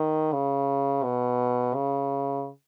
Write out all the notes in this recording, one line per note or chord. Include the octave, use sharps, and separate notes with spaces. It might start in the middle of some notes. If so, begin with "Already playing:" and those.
Already playing: D#3
C#3
B2
C#3